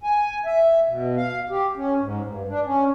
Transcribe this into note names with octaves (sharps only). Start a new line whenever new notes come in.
G#5
E5
B2
F5
G4
C#4
G#2
G2
D4
C#4